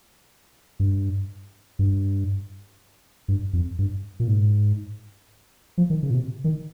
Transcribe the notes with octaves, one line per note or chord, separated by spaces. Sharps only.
G2
G2
G2
F2
G2
A#2
G#2
F3
D#3
C#3
A#2
C3
D#3